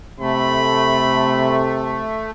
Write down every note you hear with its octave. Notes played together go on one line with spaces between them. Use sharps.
C3 A3 B5